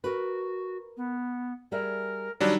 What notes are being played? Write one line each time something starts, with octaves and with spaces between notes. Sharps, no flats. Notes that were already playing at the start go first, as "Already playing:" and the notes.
F#4 A#4 B4
B3
G3 G#4 A#4 E5
D#3 F#3 G3 D4